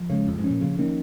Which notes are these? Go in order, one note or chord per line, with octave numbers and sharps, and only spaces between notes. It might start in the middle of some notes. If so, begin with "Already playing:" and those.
Already playing: F3
C#3 G#3 C#4
F2 F3
G#2
C#4
A#2
C#3 F3
D#3 A#3 C#4